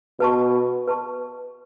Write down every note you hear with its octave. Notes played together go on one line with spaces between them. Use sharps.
B2 B4 A5 C#6
B4 A5 C#6